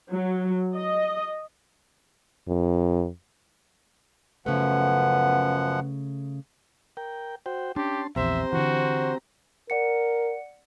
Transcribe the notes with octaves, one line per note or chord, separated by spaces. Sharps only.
F#3
D#5
F2
F#2 C#3 F3 A3 B3 F#5
A#4 G5
F#4 C5 G5
C#4 D4 G4 A5 C6
A#1 E2 C4 G4 C5 E5 A#5
D3 E3 F#4
A#4 D5 F#5 C#7